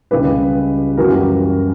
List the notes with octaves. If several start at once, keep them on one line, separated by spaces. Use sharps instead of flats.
C#2 C#3 G3 G4 B4
F#2 E3 G3 F#4 A#4
G4